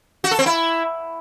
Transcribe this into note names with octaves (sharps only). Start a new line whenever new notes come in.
F#4
A4
C4
E4